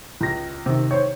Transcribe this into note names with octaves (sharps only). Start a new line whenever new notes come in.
C#2 A#6
C3 D#3
C5 C#5